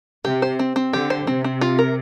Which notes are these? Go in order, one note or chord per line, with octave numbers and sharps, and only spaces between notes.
C3 G4
C5
C4
C4
D3 G4
C5
C3 C4
C4
F4
A#4